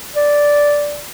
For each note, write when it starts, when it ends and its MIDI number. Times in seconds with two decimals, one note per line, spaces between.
0.16 1.02 74